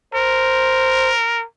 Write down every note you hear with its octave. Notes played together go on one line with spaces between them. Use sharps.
A#4 C5